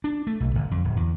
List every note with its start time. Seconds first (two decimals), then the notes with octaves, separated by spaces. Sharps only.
0.04 D4
0.27 A3
0.40 B1
0.55 G1
0.71 F2
0.85 D1
0.97 E2